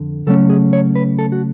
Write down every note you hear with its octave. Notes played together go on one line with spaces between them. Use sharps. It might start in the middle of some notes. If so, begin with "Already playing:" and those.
Already playing: F2 D3
C#3 F#3 A3 C#4 A4
G#4
C#5
B4
A4
F#4